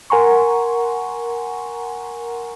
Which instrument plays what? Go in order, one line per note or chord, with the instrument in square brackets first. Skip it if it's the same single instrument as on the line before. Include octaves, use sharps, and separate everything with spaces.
[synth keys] A#4 F#5 G#5 A#5 C6 C#6